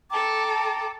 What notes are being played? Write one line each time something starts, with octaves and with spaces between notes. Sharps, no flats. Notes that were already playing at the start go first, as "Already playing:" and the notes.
A4 G5 A5 A#5 D6